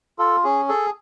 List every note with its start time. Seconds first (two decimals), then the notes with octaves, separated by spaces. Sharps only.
0.19 F4 A4
0.44 C#4 G#4
0.69 G#4 A4